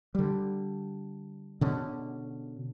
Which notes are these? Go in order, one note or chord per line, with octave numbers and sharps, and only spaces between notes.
D3 G3
B2 D3 C#4